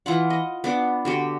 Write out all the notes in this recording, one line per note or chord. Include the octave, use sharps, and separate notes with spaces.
E3 F4 F#5
D#5
B3 D4 D6
D3 F#4 G4